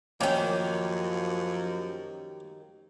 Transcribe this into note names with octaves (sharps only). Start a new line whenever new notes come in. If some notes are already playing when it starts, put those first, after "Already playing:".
F#2 D#3 F3 A#3 C#4 G4 E5